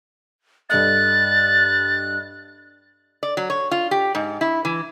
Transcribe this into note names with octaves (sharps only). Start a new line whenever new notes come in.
G2 A4 D#5 F#6 A6
D5
F#3
C#5
F4
G4
G#2
E4
E3